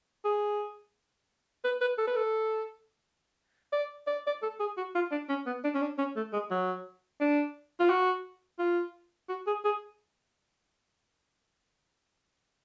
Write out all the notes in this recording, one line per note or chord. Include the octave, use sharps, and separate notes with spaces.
G#4
B4
B4
A4
B4
A4
D5
D5
D5
A4
G#4
F#4
F4
D4
C#4
B3
D4
C#4
D4
C#4
A3
G#3
F#3
D4
F4
F#4
F4
F#4
G#4
G#4